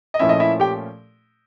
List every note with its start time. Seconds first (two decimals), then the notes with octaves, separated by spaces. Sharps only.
0.14 D#5
0.19 A#2 F3 A3 C#4 E4 E5
0.29 D#5
0.40 E4 E5
0.60 G4 G5